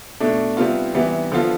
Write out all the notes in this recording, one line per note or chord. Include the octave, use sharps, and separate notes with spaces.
B2 A3 D4
C3 G3 B3 F4
C3 E3 G3 B3
D3 F3 B3 F4